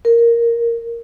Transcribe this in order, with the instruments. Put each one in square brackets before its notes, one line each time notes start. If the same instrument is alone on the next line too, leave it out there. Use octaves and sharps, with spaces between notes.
[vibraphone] A#4